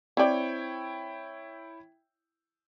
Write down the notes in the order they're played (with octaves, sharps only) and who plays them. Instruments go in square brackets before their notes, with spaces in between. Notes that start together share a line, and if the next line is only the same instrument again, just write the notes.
[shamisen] C4 D5 [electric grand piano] E4 C#5 G5